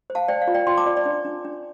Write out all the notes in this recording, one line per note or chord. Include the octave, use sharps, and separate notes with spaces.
C5
F5 A5
C5 D5 G5
F5
F4
D5 G5
F4 G5 C6
A5 D6
F4 D5
D5
D4
D4
D4